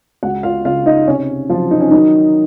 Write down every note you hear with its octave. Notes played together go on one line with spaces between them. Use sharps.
C#2 F#4 F#5
F4 F5
C#3 F4 F5
D#4 D#5
C3 C#4 C#5
F3 F#3 F4
D#4
C#4
D#3 F#3 D#4